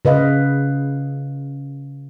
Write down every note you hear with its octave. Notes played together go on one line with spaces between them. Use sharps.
C#3 B4 D#5 F5